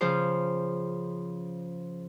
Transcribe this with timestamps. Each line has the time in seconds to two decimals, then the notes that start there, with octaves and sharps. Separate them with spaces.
0.01 C#3 F3 G#4 C5